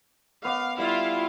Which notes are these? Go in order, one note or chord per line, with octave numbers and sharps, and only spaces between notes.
B3 D#5 F5 D6
G3 E4 F4 F5